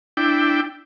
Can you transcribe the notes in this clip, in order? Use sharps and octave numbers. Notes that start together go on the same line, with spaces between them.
D4 E4 G5